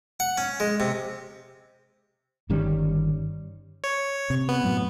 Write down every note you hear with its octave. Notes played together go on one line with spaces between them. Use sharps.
F#5
C#4
G#3
C3
G1 D#3 G3 C#4
C#5
C3
B3
F#2 A2 F#3